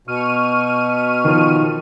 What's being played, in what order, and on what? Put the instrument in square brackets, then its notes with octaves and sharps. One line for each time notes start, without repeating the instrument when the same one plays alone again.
[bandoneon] B2 [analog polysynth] C#6 F6 D#7
[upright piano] D#3 F3